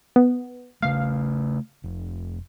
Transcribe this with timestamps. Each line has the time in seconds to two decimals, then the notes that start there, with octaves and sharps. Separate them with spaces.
0.16 B3
0.82 C#3 A3 F5
1.84 F1